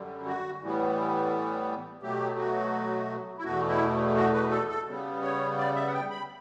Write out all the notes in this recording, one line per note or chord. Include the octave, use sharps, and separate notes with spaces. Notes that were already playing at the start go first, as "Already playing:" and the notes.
Already playing: F#2 D3 G3
F#4
A2 E3 G3 B3
B2 F#3 A3 G4
F#4
E4
E2 B2 A3 F#4
E4
F#4
B4
A4
A4
C#3 G3 B3
C#5
D5
E5
F#5
G5
B5